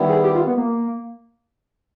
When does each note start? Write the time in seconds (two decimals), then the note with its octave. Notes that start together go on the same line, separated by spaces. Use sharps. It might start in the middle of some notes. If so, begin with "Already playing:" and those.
Already playing: D#3 G3 B3 E4
0.09 G#4
0.24 G4
0.35 F4
0.47 B3
0.57 A#3